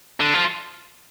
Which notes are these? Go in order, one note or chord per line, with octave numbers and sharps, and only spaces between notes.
D3
F3